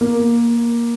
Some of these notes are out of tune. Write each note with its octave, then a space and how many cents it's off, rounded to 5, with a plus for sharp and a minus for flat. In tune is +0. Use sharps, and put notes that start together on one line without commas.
A#3 +10